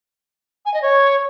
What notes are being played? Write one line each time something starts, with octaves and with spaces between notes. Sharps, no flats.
G#5
D#5
C#5